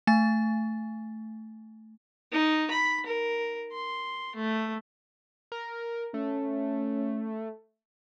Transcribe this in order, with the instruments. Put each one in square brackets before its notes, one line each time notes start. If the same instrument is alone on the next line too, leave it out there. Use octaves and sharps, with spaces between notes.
[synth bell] A3 G#5 A6
[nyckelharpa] D#4
B5
A#4
C6
A3
[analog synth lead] A#4
[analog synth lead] A3 [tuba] C#4